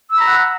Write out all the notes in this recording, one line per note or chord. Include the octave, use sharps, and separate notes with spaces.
F#5 A#5 B5 E6